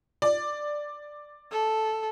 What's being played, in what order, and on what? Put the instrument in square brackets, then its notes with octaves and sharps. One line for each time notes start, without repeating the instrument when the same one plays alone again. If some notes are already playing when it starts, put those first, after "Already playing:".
[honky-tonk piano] D5
[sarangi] A4